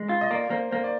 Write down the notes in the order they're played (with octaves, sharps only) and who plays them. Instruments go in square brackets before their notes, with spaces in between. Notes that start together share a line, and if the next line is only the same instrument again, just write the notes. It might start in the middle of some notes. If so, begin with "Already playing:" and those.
Already playing: [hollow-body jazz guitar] G#3
F4
[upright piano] D#5
[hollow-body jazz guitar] A#3 [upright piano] D5
[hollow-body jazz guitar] A#3 [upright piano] C5
[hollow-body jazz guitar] A#3 [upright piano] C5
[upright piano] D5